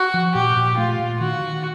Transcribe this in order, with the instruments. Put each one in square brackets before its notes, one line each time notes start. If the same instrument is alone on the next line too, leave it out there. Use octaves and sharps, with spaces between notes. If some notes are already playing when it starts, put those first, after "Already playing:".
Already playing: [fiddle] F#4
[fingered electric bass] F3
[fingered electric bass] A#2 [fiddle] G4
[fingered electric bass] A#2
[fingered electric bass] A3 [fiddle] F4
[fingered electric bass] A#2
[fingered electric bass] D#3 [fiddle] F#4
[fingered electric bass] D#3